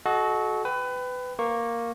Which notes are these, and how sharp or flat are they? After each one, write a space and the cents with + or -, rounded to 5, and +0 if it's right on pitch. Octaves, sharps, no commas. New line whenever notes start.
F#4 +0 A4 -35 D#5 +0
B4 +25 G5 +0
A#3 +0 C#6 -20